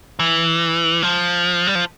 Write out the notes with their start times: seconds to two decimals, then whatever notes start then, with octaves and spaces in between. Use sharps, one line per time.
0.19 E3
1.03 F3
1.67 G3
1.75 F3